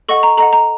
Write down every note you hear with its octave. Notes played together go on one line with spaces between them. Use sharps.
A4 D#5 F#5 C#6
A#5
A4 D#5 F#5 A#5
A#5